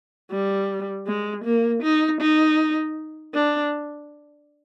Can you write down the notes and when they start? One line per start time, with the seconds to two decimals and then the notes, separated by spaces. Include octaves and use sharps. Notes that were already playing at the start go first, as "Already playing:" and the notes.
0.31 G3
1.07 G#3
1.44 A#3
1.83 D#4
2.21 D#4
3.34 D4